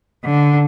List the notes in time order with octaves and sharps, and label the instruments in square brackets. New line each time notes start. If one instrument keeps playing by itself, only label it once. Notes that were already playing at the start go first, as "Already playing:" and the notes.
[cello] D3